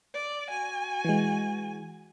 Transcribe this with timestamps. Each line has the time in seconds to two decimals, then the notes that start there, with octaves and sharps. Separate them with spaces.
0.13 D5
0.48 F#4 G#5
1.05 E3 G#3